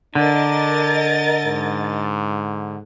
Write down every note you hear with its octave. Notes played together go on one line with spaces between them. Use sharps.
D3 D4 A#4 D#5 A6
G#2